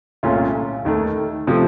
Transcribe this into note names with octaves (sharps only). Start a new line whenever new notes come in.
C2 A#2 A3 C#4 F4
D#2 D#3 A3
C3 F3 A3